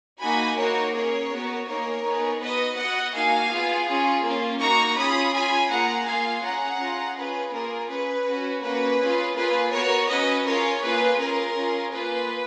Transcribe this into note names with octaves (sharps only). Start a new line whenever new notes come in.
A#3 D#4 F#4 G#5 B5
A#3 D#4 F#4 A#4 C#5
C#4 G#4 A#4 C#5
B3 F#4
A#3 D#4 G#4 A#4 C#5
B3 D#4 G#4
B3 F#4 B4 D#5
B3 F#4 D#5 F#5
A#3 D#4 F#4 F5 G#5
B3 F4 G#4
C#4 F4 G#4
A#3 C#4 F4
A#3 D#4 F#4 A#5 C#6
C#4 F4 G#4 B5 D#6
C#4 F4 G#4 G#5 B5
A#3 F4 G#4 F#5 A#5
A#3 F4 G#4 F5 G#5
C#4 G#4 F#5 A#5
C#4 F4 G#4
C#4 F4 G#4 B4
A#3 F4 G#4 A#4
C#4 G#4 B4
C#4 F#4
A#3 C#4 F#4 B4
C#4 F4 G#4
A#3 F4 G#4 B4
B3 F#4 A#4 C#5
C#4 F#4 B4 D#5
C#4 F4 G#4 A#4 C#5
A#3 F4 G#4 B4
C#4 F4 G#4 A#4
C#4 F4 G#4
A#3 F4 G#4 B4